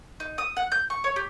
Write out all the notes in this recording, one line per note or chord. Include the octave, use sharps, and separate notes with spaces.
D#4
D#6
F#5
G6
C#6
C#5
G4